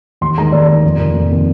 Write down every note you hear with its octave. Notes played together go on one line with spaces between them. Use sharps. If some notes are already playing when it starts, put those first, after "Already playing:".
D#2 C6
D#3 G#3 A#5
D#2 D5
D#3 G#3
F2
C3 D#3 A#3
F2
C3 D#3 A#3